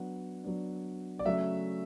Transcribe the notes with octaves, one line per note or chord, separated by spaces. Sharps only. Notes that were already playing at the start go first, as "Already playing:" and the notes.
Already playing: F#3 B3 D4 F#5
F#3 B3 D4
D5
C#3 F#3 A3 E5